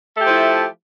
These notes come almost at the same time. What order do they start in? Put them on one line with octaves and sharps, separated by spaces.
A3 G4 F3 E4